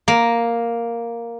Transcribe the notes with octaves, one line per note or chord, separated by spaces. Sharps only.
A#3